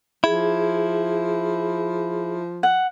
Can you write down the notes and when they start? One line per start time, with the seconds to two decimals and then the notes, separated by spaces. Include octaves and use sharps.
0.24 F3 E4 G#4
2.63 F#5